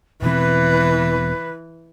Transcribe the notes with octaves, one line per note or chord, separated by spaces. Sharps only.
E1 B2 E3 C4 B4